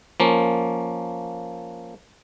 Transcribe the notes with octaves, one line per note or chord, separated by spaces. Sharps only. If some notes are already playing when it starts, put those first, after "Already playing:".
F3 A#3 C#4